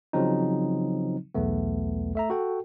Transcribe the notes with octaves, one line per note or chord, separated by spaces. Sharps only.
C#3 F3 F#3 C4 D#4
B1 E2 A3 B3
A3 E5 A#5
F#4 A4 G5